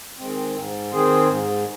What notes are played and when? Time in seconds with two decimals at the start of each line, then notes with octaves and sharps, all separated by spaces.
0.18 D#3 G#3 C4
0.55 G#2
0.92 D#3 C4 G#4 C5
1.28 G#2